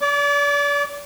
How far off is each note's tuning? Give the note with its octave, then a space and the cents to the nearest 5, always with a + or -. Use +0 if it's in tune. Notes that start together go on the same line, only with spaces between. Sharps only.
D5 -40 D6 -10